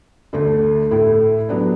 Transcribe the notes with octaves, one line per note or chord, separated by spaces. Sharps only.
D2 D3 A3
A2 A3 E4
F#3 B3 D4